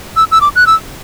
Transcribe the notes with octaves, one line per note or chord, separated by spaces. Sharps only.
E6
E6
D6
F#6
E6